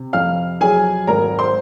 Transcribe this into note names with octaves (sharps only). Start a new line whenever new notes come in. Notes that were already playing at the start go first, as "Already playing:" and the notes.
Already playing: C3
F2 F5 F6
F#3 G#4 G#5
G#1 A#4 A#5
C5 C6